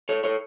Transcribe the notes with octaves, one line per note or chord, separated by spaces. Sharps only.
A4 C#5
A4 C#5